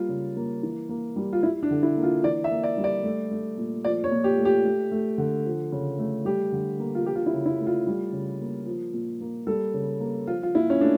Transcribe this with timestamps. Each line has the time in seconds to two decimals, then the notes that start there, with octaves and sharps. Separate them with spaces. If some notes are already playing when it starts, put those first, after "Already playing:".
Already playing: G3 A#3 F4
0.09 C#3
0.37 A#3
0.63 E3
0.89 A#3
1.16 G3
1.33 F4
1.43 G3 E4
1.63 D4
1.71 D3
1.83 E4
1.97 A#3
2.03 F4
2.23 E3 D5
2.44 E5
2.51 A#3
2.63 D5
2.77 G3
2.84 D5
3.03 A3
3.31 A3
3.57 A#2
3.85 F3 D5
4.04 C#5
4.11 A#2
4.24 G4
4.37 A3
4.45 G4
4.65 A3
4.92 A3
5.18 D3
5.46 F3
5.72 C#3
5.99 A3
6.25 G3 G4
6.52 D3
6.79 A#3
6.95 F4
7.06 F3 G4
7.15 F4
7.26 E4
7.33 C#3
7.46 E4
7.60 A3
7.66 F4
7.87 G3
8.12 C#3
8.40 A#3
8.66 F3
8.93 A#2
9.21 A#3
9.47 G3 A4
9.74 C#3
10.00 A#3
10.27 F3 F4
10.43 F4
10.54 A#2 E4
10.70 C#4
10.81 A3 D4